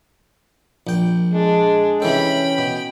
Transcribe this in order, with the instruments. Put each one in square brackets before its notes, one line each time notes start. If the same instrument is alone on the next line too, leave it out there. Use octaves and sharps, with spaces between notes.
[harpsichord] A#1 G5
[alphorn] G#3 [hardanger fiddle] D4
[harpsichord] C3 E3 A4 [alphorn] C#4 [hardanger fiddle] G5 B5
[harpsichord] B2